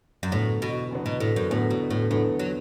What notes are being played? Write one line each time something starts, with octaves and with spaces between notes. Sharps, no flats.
F#2
E2 A2 D3 F#3 B3
B2
E2 D3 F#3 B3
B2
A2
F#2
E2 A2 D3 F#3 B3
B2
A2
E2 A2 D3 F#3 B3
F#3